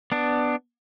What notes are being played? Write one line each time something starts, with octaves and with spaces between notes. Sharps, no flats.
B3 D4